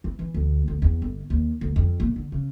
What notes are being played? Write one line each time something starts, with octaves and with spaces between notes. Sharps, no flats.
E3
E3
D2
D2
E2
G1
D#2
D2
F2
A#2
D3
C#3